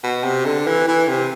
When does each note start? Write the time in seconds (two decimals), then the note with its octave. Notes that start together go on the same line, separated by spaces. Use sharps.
0.04 B2
0.24 C3
0.45 D3
0.67 E3
0.88 E3
1.08 C3